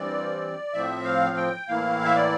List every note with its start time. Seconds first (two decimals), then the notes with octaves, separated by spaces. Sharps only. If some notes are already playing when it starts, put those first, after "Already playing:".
Already playing: G2 E3 G3 C4 D5
0.73 A2 F3 C4 E5
1.04 F5
1.36 G5
1.68 A2 E3 A#3 E4 F5
2.05 E5
2.15 D5